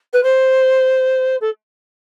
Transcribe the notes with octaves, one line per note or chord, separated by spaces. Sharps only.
B4
C5
A4